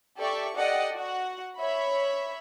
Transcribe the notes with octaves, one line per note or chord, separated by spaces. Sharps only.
G4 A4 D5 E5 C#6
G4 A4 D5 D#5 F#5 G5
F#4 F#5
C#5 E5 B5